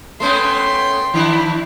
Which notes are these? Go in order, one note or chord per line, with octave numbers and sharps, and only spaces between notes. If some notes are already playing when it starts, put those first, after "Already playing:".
A3 B3 C#4 G5 C6
D#3 D4 E4